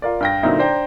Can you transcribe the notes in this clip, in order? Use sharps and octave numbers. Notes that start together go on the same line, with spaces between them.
F4 A#4 D5
G2 G5 A#6
A#2 D3 F#3 C4 D#4 E4
D4 C5 G5 A#5